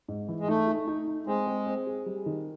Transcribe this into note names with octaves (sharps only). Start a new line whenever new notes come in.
G#2
E3
G#3
A3 D#4
D#4
D#4
D#4
G#3 C4
C4
C4
G#4
G3
D#3